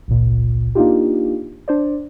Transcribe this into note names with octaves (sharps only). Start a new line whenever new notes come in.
G#1 C#2 A#2
A#3 D4 D#4 F4 G4
D4 C5 D5